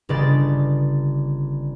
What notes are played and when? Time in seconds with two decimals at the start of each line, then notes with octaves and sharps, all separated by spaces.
0.09 G1 C#3 G4 D5 D#5 A6